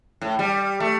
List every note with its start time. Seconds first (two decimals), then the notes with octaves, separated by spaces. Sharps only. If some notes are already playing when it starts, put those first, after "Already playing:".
0.22 A2
0.39 G3
0.80 A3